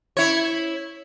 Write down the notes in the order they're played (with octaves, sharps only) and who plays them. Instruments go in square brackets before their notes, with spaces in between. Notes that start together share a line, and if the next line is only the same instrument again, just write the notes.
[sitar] E4 C#5